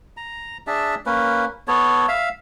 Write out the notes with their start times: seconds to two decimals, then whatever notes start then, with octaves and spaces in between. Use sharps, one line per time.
0.17 A#5
0.67 D4 G#4 E5 A5
1.06 A#3 C#4 B4
1.68 B3 A4 C#5
2.08 E5 F5